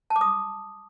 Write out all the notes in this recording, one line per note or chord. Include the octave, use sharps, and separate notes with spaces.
A5
D6
D#6